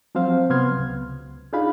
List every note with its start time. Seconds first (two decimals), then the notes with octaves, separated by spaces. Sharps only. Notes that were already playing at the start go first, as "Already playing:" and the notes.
0.15 F3 F#3 C4 C5 F5
0.50 C3 F#3 B3 C6 F6 G#6
0.77 C#2
1.53 D4 D#4 F4 G#4 F5 B5